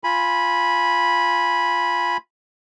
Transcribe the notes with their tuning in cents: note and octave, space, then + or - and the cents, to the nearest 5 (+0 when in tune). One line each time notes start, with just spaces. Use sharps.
F4 +0 G#5 +0 B5 -10